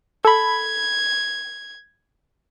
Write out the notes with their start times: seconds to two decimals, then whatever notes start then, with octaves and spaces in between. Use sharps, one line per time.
0.25 A4 B5 G#6